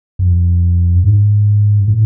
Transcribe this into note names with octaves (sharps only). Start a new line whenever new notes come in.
F2
G#2
A2